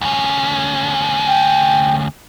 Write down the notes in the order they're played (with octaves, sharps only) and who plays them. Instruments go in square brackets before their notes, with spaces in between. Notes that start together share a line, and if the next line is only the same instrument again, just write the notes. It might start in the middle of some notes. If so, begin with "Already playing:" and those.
[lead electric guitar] D2 C#4
[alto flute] G5